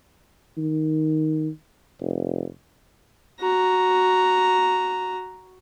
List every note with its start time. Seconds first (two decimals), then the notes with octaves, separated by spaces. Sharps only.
0.57 D#3
2.01 F1
3.40 F#4 A#5